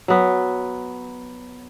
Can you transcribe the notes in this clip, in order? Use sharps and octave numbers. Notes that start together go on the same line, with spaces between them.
F#3 B3